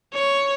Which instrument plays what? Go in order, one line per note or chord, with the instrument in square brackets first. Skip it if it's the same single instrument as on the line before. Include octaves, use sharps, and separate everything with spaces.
[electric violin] C#5